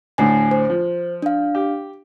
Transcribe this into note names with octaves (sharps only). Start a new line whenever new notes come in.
D2 A2 G#5 C7
C5
F3
D4 F5
G4